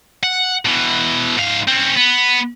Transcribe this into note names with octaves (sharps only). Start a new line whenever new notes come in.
F#5
B2 E3
G#2 F5
C4 C#4
B3